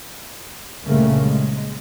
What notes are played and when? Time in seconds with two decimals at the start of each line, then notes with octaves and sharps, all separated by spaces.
0.81 C2 G2 A#2 C#3 A3 A#3
1.20 G#3